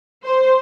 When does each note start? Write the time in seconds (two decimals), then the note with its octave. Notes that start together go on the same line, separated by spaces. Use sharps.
0.23 C5